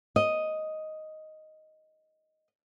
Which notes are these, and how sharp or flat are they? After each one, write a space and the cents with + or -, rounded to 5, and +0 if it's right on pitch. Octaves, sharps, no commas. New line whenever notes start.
D#5 +5